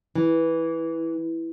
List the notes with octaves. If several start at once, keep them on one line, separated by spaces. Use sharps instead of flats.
E3